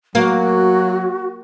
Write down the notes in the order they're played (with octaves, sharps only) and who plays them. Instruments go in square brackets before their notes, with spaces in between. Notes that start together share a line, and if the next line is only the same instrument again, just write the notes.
[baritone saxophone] F#3 [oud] A#3 [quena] F#4